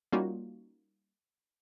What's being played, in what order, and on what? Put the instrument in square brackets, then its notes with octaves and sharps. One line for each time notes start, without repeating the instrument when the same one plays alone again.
[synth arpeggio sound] G3 A#3 C#4 D#4 F4 F#4